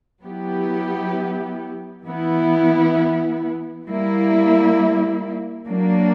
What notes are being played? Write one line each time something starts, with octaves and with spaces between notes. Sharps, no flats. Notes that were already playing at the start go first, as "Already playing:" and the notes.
F#3 B3 E4 G4
E3 B3 E4
G3 A#3 E4
F#3 A#3 D4